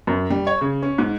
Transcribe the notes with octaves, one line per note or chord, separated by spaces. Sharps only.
F#2
G3
C#5
C#3
C#4
G#2